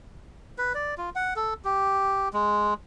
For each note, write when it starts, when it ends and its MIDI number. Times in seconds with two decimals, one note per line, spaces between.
0.58 0.73 71
0.74 0.94 74
0.98 1.10 65
1.15 1.34 78
1.36 1.54 69
1.65 2.29 67
2.33 2.74 56